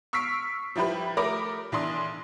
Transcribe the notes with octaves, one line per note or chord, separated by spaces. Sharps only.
C#6 E6 F6 B6 C7 D7
F3 G3 E4 G4 B4
A3 A#4 B5 D6 D#6
B1 E3 D4 C6 D#6